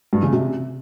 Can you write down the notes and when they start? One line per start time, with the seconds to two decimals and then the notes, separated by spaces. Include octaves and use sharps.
0.13 G2
0.23 C#3
0.33 C3